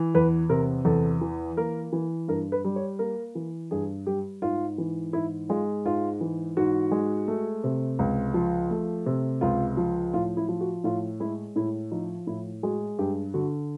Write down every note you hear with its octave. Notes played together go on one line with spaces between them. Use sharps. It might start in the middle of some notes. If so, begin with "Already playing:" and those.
Already playing: E3
E2 B4
C3 A#4
E2 A4
E3
A#3 A#4
E3
G2 A#4
B4
G3
C#5
A#3 A#4
E3
G2 G#4
G3 G4
G#2 F4
E3
G#2 E4
G#3 F4
G#2 F4
E3
G#2 F#4
G#3
A3
C3
C#2
F3
A3
C3
C#2 F4
F3
A2 F4
E4
F3
F#4
A2 F4
G#3 E4
A2 E4
F3 D#4
A2 E4
G#3 F#4
G2 G4
D3 F#4